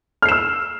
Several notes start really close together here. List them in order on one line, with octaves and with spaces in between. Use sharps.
F6 C7 E7 E6